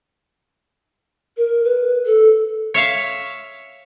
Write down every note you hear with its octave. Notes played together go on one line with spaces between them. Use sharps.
A#4
B4
A4
C#5 E5 F5